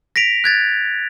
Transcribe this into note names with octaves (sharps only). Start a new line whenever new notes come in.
A#6 B6 D7 F7
F#6 G#6 A6